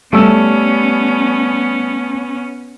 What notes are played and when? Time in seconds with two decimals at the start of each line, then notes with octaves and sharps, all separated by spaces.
0.13 G3 A3 B3 C#4 E6